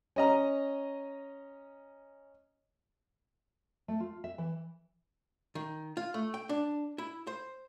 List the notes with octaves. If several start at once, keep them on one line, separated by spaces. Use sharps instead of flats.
C#4 D#5 A#5
A3
F4
E5
E3
D#3
F4
A3
G5
D4
E4
C5